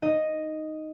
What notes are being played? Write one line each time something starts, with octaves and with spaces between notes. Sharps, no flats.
D#4 D#5